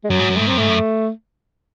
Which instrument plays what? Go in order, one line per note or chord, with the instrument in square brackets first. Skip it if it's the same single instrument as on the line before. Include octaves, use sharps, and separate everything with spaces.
[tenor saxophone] G#3
[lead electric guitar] F#2 [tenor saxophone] F#3
[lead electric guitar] G#2
F#2
[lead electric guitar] G#2 [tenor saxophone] A3
[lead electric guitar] F#2 [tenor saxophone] C4
[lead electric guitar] G#2 [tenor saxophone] A3
[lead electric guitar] F#2